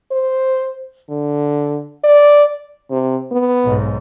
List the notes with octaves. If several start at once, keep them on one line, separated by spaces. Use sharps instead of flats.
C5
D3
D5
C3
B3
B1 G#2